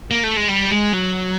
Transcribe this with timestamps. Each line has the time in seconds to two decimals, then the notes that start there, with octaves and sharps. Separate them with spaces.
0.11 A#3
0.24 A3
0.37 G#3
0.49 G3
0.72 G#3
0.94 F#3